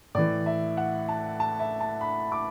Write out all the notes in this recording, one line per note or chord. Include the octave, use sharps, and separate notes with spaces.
A2 E3 D5
E5
F#5
A5
A5
E5
A5
B5
D6